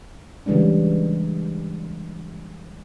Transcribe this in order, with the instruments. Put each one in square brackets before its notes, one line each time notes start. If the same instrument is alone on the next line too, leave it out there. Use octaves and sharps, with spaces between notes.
[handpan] C#3 E3 G3 G#3 D4